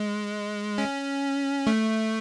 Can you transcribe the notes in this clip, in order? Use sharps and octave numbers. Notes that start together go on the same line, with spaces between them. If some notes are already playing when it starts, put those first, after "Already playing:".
Already playing: G#3
C#4
A3